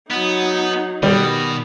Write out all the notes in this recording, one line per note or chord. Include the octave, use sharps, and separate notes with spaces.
F#3 B3 D#4
B2 D#3 G3